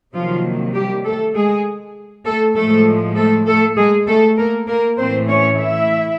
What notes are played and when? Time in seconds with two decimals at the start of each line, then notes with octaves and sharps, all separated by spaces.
0.14 C3 D#3 F3 F#3 A#3 F4
0.75 G3 G4
1.05 A3 A4
1.35 G#3 G#4
2.26 A3 A4
2.56 A2 F3 G#3 A3 A4
3.17 A3 A4
3.47 A3 A4
3.77 G#3 G#4
4.07 A3 A4
4.38 A#3 A#4
4.68 A#3 A#4
4.98 A2 E3 A3 C4 C5
5.28 C#4 C#5
5.59 E4 E5